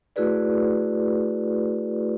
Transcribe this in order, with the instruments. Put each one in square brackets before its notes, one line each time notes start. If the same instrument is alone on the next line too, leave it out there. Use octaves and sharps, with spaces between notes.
[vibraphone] A3 E4 F#4 G#4 B4 D5